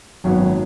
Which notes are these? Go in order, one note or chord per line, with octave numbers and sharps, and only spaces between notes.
G#1 F#2 F#3 B3